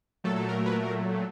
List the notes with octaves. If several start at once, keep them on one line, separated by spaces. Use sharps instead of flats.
A#2 F#3 A3 A4
A4
A#4
B4
A#4